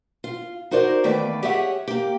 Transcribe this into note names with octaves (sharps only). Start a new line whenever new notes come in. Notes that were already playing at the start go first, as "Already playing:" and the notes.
F4
D#4 F#4 A#4 C5 D5
E2 D#3 A3 A#3 B4 D5
G4 G#4 C#5 D#5 E5 F#5
A#3 G4